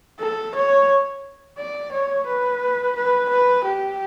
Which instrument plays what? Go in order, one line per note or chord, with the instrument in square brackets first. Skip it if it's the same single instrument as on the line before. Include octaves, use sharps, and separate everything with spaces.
[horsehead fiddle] A4
C#5
D5
C#5
B4
B4
B4
G4